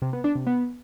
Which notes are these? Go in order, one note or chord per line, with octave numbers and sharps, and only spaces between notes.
C3
B3
D4
C3
B3